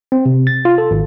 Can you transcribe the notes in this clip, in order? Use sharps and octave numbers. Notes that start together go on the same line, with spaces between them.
C4
C3
A6
F4
A4
G#1